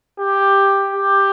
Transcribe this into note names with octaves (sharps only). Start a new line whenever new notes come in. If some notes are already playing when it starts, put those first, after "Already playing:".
G4
G4